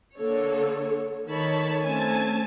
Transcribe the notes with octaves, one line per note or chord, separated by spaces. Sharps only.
D3 A#3 A4 C#5
D#3 A4 C#5 A5 B5
A3 C4 C#4 G#5 A5